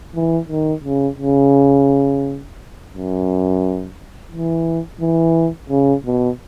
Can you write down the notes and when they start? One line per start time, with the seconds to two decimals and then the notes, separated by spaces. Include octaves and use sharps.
0.15 E3
0.49 D#3
0.84 C#3
1.18 C#3
2.93 F#2
4.31 E3
5.01 E3
5.70 C#3
6.06 B2